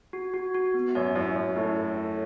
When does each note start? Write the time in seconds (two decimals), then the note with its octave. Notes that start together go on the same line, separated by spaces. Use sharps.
0.13 F#4
0.34 F#4
0.54 F#4
0.74 B3
0.95 F#2 C#5
1.16 F#2 E4
1.36 F#2 C#5
1.56 A2 A4
1.76 C#5
1.97 A4